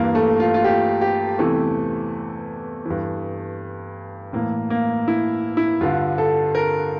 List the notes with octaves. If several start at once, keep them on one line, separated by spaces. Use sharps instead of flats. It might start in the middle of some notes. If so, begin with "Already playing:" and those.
Already playing: G2 E3 A#3
A3
F4
F4
G4
G4
E2 C3 E3 A3
G2 E3
A2 E3 A#3
A#3
E4
E4
G2 D3 F4
A4
A#4